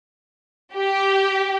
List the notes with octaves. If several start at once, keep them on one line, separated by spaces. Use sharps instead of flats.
G4